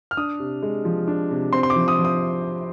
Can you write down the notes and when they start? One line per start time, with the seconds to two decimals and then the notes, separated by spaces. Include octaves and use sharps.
0.11 F6
0.17 D4 D#6
0.40 C3
0.62 G#3
0.85 F3
1.08 D4
1.31 C3
1.53 C4 C6
1.63 C6
1.70 D6
1.76 F3
1.88 D#6
1.99 F3
2.05 D#6